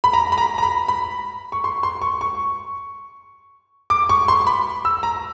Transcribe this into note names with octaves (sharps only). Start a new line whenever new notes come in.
B5
A#5
B5
A#5
A#5
B5
B5
C#6
C6
C6
C#6
C#6
D6
C#6
C6
B5
E6
A#5